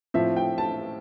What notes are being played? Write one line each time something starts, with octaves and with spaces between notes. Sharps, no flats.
A2 F3 C4 E5
G5
A5